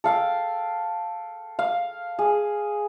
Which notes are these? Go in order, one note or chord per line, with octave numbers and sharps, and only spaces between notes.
A4 F5 G5
F5
G#4